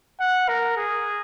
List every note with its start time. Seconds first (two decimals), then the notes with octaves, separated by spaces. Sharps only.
0.20 F#5
0.49 A#4
0.77 G#4